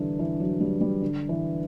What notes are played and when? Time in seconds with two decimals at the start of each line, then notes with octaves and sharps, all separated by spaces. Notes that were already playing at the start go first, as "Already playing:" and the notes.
Already playing: D3 E3 G3
0.19 E3
0.40 F#3
0.60 G3
0.81 G3
1.02 D3
1.29 E3